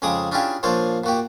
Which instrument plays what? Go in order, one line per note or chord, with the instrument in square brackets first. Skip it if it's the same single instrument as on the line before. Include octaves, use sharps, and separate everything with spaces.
[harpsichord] F2 C#3 G#3 G#4 D6 D#6
C#4 D4 E4 F4 G4 G#4
A#2 F3 D4 F4 C5 C#5
A#2 F#4 G4